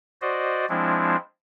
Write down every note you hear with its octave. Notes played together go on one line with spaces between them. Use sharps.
F#4 C5 D5 D#5
F3 G#3 C4 D4 E4